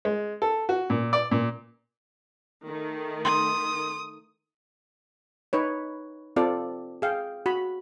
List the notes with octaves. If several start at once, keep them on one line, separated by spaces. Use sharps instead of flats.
G#3
A4
F#4
A#2
D5
A#2
D#3 A3
C6 D#6
D#4 B4 C#5
C4 F4 A4 D5
G#4 F5 G5
F#4 B5